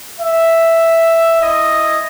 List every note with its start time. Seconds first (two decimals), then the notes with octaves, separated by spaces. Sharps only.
0.19 E5
1.40 E4 D#5